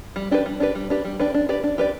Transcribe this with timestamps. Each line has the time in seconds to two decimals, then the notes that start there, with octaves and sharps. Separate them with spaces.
0.16 G3
0.31 D4 G4 B4
0.46 G3
0.60 D4 G4 B4
0.75 G3
0.90 D4 G4 B4
1.05 G3
1.20 D4 G4 B4
1.34 D4
1.49 G4 B4 D5
1.64 D4
1.78 G4 B4 D5